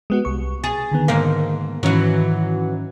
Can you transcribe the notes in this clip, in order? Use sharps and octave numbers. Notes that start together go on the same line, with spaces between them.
G#3 B3 F#4
C2 C#6
G#4 A6
D3 D#3 B3
G#2 A#3
G#2 D#3 E3 F#3 C#4